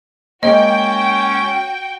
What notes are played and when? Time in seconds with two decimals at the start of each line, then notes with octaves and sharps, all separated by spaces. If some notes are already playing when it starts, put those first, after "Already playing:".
0.43 G#3 A#3 C#4 F#4 D#5 G5